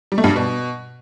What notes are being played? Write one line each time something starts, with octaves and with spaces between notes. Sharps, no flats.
G3
A3
G2
G3
B2